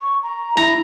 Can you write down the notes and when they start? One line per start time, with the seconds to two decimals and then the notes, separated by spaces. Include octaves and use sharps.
0.02 C#6
0.23 A#5
0.57 E4 A#5